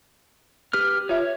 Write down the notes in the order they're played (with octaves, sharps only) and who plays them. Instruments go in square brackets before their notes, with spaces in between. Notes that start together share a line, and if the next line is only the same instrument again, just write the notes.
[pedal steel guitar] G4 B4 F6
[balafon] F4 E5 [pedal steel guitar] C#5